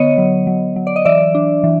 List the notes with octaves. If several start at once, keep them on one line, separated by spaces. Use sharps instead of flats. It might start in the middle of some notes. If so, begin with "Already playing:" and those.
Already playing: D3 B3 C#5 D#5
F#3
F#3
F#3
D5
D#5
E3 D5 E5
D4
E3